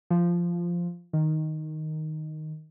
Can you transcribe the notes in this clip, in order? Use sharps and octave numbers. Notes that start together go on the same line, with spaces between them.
F3
D#3